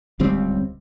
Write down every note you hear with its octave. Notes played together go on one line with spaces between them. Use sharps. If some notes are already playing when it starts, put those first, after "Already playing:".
D1 C#2 G3 C4